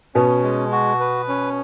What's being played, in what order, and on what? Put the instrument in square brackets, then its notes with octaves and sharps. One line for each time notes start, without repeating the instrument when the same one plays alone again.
[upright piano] B2 B3 [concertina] C#4
[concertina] G#3
F#4
B4
C#4